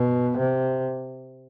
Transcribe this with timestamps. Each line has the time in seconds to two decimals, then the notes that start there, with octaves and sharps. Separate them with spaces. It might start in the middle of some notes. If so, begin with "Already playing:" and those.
Already playing: B2
0.38 C3